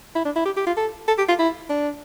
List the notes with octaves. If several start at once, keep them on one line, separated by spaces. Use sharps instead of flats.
E4
D4
E4
G4
G4
F4
A4
A4
G4
F4
E4
D4